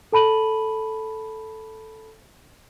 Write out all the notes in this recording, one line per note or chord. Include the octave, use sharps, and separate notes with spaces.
A4 A5 B5 D#7 F#7